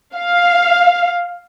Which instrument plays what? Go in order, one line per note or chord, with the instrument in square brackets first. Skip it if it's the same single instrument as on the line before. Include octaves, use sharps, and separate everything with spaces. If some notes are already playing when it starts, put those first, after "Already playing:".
[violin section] F5